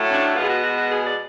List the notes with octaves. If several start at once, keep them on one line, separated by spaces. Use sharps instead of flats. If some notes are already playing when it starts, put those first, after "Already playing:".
Already playing: A2 F#3 A3
C#4
D4
B2 G#3 B3 F4
G#4
F#4
F#4
F#4
G#4
D5